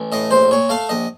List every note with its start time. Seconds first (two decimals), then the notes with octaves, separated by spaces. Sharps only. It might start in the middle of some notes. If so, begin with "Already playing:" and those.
Already playing: A1
0.12 A2 D#5
0.31 A#1 C5
0.51 A#2 C#5
0.69 A3 F5
0.89 A#1 D#5